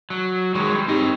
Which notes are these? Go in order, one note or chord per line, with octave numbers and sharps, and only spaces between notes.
F#3
D#3 F#3 G#3 C#6
G3
C4 D#4 G4 D#5 C#6